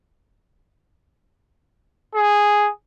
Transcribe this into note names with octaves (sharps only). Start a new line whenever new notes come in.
G#4